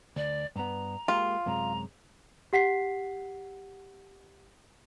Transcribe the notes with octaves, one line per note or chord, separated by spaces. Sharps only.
D2 D5
G2 B3 A#5
G#3 A#3 F4 G4
F#2 C3 G#3 A#5
G4 F#5 B6 C7